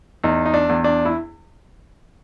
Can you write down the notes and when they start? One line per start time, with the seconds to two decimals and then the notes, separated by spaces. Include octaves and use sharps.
0.24 E2 D#4
0.46 D#4
0.54 D4
0.69 E2
0.84 D4
1.05 E4